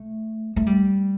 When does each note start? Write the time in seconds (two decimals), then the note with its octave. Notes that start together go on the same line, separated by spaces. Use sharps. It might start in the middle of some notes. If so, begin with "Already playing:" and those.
Already playing: A3
0.56 A3
0.67 G3